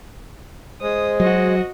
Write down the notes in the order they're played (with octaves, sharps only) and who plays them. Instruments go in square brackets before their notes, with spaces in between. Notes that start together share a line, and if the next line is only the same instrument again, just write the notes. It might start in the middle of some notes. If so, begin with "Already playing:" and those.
[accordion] G#3 [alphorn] C5 [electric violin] D#6
[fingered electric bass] F#3 [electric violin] F#4 D#5